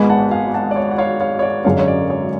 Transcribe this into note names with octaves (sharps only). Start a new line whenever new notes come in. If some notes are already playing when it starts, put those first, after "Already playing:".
Already playing: G#1 G#2 G#3 B3 G#5 B5
F#5 A5
F5 G#5
F#5 A5
D5
C#5
F#5
C#5 F5
C#5 F5
C#5
D5
G#1 F#2 D3 G#3 C#4 C#5 F5
C#5
D5
C#5